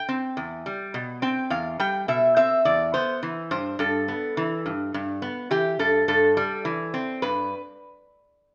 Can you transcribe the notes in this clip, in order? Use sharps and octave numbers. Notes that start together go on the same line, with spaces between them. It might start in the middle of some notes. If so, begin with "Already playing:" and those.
Already playing: G5
C4
E2
G3
B2
C4 G5
E2 F5
G3 G5
B2 E5
C4 E5
E2 D5
B3 C5
E3
G2 C5
G2 A4
B3
E3
G2
G2
B3
E3 G4
G2 A4
G2 A4
G3
E3
C4
G2 B4